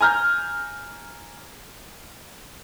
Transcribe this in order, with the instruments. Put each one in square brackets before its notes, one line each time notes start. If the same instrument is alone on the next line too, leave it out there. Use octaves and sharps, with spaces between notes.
[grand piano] G#5 A#5 F6 G6